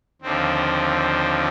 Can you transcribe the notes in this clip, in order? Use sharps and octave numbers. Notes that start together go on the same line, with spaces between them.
D#2 D3 F3 C4